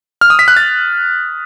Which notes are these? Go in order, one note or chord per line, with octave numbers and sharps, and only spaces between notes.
F6
D#6
B6
F#6
A6